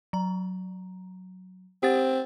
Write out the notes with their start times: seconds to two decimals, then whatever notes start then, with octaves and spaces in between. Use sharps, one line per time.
0.13 F#3 A#5
1.83 C4 G4 F#5 A6